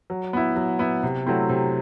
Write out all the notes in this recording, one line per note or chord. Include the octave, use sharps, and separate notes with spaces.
F#3
B3 E4
F#3
B3 E4
C3
F#3 A3 C4 E4
C3